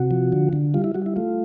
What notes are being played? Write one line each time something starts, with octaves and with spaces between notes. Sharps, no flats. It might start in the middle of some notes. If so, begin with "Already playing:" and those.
Already playing: C3 F#4
F3
D3
D3
G3 F4
E4
G3 F#4
E4
A3 F4